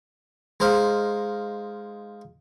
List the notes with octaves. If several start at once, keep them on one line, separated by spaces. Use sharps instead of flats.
G#3 D#4 C5 F5